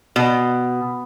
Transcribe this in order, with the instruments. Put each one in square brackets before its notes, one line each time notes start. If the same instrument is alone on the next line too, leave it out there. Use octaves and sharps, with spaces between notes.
[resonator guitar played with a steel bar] B2